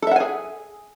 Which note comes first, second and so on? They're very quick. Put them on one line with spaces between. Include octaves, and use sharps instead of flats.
A4 E5 F#5 G#5 G#4